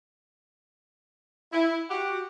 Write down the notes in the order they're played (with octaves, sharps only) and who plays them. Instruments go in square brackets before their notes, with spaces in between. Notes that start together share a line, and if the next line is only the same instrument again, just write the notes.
[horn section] E4
F#4 G4 F#5